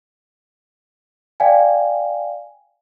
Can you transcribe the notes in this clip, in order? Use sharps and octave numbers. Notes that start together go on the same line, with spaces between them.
D5 F5 G5 G#5